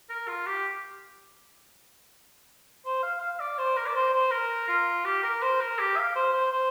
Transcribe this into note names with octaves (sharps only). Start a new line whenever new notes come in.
A#4
F4
G4
C5
F5
F5
D5
C5
A#4
D5
C5
C5
A#4
F4
G4
A#4
C5
A#4
G4
F5
C5
C5
C5